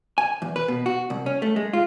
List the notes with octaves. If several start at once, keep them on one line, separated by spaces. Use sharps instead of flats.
G#5
E2
B4
B2
F#4
C2
C#4
A3
G#3
F4